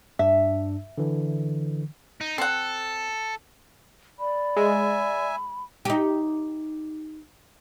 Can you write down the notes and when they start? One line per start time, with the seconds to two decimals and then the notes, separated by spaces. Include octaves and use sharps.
0.19 G2 D4 E5
0.98 D3 E3
2.21 D#4
2.38 C4 A4 F#5
4.19 D5 B5
4.57 G#3 E5 G#5
5.85 D#4 G4